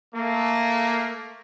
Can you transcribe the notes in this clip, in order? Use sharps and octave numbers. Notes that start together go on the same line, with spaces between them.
A3 A#3